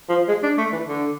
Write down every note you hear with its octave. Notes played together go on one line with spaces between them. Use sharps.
F3
G#3
D4
A3
E3
D3